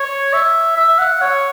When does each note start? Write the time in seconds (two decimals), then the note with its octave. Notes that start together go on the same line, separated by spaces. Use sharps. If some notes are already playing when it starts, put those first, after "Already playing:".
Already playing: C#5
0.33 E5
0.77 E5
0.99 F#5
1.22 C#5